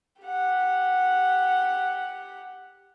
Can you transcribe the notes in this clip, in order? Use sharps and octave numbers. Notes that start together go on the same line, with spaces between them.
G4 F#5